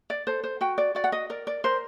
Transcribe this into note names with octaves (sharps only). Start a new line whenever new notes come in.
D5
A4 C5
C5
F#4 G5
D5
F#4 D5
F#5
D#5
A#4 D5
D5
A#4 C5